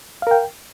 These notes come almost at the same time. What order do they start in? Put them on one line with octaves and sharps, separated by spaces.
F5 A#4 G5